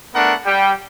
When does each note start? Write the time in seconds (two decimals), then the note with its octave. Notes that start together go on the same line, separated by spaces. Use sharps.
0.14 A3 B3 D4 A#4 F#5
0.45 G3 G5